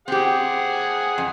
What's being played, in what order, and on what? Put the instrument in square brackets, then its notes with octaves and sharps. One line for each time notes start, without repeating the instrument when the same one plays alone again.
[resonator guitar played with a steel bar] C4 G4 [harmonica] G#4 F#5
[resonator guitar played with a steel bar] F2